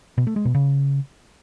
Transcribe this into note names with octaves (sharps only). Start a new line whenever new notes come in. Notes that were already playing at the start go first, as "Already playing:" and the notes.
B2
A3
G#3
B2
C#3